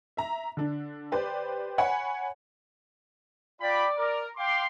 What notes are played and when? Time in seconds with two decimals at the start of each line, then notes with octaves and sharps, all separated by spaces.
0.17 E5 A#5
0.57 D3 D4
1.12 G4 B4 C5 D5
1.78 C#5 F#5 G#5 B5
3.61 F4 D5 G5 B5
3.97 A#4
4.37 F5 G5 C6 D6